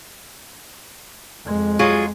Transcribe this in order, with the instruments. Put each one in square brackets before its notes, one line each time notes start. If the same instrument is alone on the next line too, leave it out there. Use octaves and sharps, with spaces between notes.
[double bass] F2 G#3
[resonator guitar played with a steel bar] F#3 F4 G#4